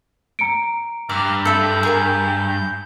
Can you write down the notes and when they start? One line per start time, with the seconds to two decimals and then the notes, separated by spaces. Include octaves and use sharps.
0.39 A#5 C#7 D7
1.09 G2 A#5 D6 E6 F6
1.45 A4 E5 C6 E6 G6
1.83 G#4 A#4 G#5